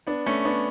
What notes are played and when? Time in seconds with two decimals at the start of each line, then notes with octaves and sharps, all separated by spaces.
0.07 B3 D4
0.26 A3 C#4
0.45 B3 D4